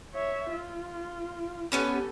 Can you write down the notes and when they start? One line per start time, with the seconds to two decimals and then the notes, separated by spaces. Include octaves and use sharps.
0.14 C#5 E5
0.50 F4
1.72 B3 C#4 G4 A4 B4